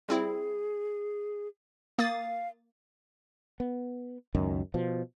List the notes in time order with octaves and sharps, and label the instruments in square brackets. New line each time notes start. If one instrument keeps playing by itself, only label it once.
[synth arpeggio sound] G3 C4 E4 [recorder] G#4
[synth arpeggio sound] A#3 D#6 A6 [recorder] F5
[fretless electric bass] B3
C#2 F#2 D#3
B2 F3